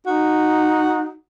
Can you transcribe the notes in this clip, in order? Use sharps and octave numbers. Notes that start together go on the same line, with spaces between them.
D#4 F#4